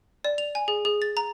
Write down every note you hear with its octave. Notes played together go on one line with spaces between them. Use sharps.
D5
F7
G#5
G#4
G#4
A6
A#5